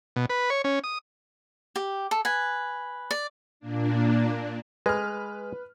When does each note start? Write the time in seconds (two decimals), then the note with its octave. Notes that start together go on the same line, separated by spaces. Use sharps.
0.16 B2
0.30 B4
0.50 C#5
0.64 C#4
0.84 D#6
1.76 G4
2.11 A4
2.25 B4 G#5
3.11 D5
3.60 A#2 A#3 D4
4.86 G#3 B4 F6